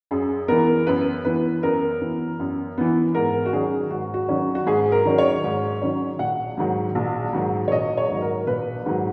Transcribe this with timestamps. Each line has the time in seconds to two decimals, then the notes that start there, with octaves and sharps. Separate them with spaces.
0.11 F#2 G#4
0.48 E3 B3 A#4
0.87 F#2 B4
1.25 E3 B3 B4
1.63 F#2 A#4
2.01 E3 B3
2.40 F#2
2.78 E3 B3
3.15 G#2 A#4
3.46 F#4
3.53 D#3 F#3 C#4 G#4
3.91 G#2 F#4
4.14 F#4
4.29 D#3 F#3 C#4
4.55 F#4
4.67 G#2 G#4
4.92 A#4
5.05 D#3 F#3 C#4
5.18 C#5
5.44 G#2
5.82 D#3 F#3 C#4
6.19 A#1 F#5
6.57 G#2 D#3 F#3
6.95 A#1
7.33 G#2 D#3 F#3
7.68 C#5
7.72 A#1 D#5
7.97 C#5
8.10 G#2 D#3 F#3
8.22 A#4
8.47 A#1 B4
8.86 G#2 D#3 F#3